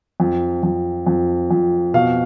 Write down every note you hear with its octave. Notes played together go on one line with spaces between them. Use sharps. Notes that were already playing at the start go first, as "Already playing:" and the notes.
F2
F2
F2
F2
B2 F5